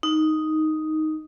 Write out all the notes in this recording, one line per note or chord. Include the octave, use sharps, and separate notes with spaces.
D#4